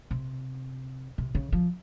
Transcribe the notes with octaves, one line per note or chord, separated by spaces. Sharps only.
C3
C3
C#3
F3